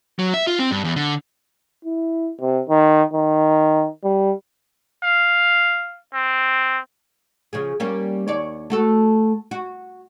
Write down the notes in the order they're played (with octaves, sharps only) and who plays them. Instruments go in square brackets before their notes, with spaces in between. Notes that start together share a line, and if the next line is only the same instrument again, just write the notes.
[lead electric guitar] F#3
E5
F4
C4
G2
E2
D3
[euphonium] E4
C3
D#3
D#3
G3
[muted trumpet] F5
C4
[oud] C#3 F3 G#4
G3 A#3 C#4
D#2 C#5 D5
A3 F#4 A4
F#4